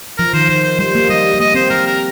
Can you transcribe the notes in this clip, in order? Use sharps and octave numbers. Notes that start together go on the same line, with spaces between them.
F3 A#4
D#3 C5
D#3 C5
C5
G3 C5
A#3
G3 D#5
G3
A#3 D#5
C4 C5
G3 A#4
A#4